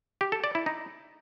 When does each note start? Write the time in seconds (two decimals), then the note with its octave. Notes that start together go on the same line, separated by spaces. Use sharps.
0.21 G4
0.32 A4
0.44 D5
0.55 E4
0.66 D#4